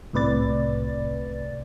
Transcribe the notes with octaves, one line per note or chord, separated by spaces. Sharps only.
C2 A2 C3 B4 D5 A6